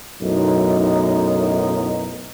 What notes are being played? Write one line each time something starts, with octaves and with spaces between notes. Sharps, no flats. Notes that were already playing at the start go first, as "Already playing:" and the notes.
B1 F#2 A2 D#4